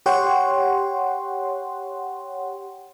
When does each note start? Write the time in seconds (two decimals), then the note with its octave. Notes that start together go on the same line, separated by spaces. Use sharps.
0.06 G4 C#5 F#5 G5 C6